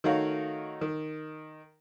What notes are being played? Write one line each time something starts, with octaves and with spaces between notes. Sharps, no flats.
D#3 A3 D#4 F#4 C#5 F5
D#3